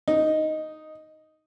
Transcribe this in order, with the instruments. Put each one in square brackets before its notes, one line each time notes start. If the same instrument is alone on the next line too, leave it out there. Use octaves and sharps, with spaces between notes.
[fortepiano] D#4